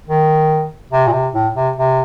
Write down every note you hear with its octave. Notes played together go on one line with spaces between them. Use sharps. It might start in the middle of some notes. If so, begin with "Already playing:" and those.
D#3
C3
A#2
C3
A2
C3
C3